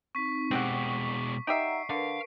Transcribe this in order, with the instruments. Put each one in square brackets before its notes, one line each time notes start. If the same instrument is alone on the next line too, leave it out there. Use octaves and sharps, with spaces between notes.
[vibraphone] C4 D#4 [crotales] C#6 B6
[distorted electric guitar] B2 G#3 [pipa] C4 G4 F#5 [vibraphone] D6
[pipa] D#4 G4 E5 [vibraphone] D5 F#5 A#5 [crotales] C7 D7
[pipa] D3 [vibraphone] A#4 B4 [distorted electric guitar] F5